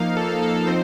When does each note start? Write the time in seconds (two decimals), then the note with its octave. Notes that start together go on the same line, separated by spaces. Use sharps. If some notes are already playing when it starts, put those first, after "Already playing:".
Already playing: F3 A#3 D#4 F5
0.17 A4
0.42 A4
0.67 F3 C4 D#4 C5